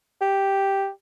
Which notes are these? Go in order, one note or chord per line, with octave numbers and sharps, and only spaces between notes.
G4